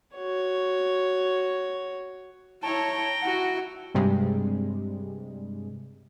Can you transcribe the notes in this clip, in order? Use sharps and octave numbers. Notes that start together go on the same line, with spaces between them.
F#4 C#5
E4 C#5 G5 A5 A#5
E4 F#4 F#5
G2 C3 G3 G#3